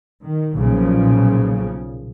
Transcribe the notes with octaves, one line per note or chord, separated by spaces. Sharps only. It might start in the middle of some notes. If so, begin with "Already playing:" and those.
D#3
B1 A#2 C#3 F3